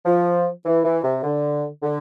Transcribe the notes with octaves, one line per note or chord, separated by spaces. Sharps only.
F3
E3
E3
C3
D3
D3